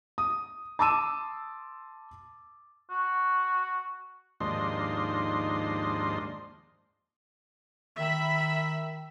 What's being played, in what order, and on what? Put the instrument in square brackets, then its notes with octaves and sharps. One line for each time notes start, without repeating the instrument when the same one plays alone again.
[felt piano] D#6
A5 C6 D6 E6 D#7 E7
[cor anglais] F#4
[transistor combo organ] D#2 G#2 F3 D4 D#5 C6
[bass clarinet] D#3 [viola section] E5 B5